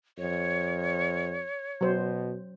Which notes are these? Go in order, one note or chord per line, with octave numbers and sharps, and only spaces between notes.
F2 C#5
B2 F#3 C5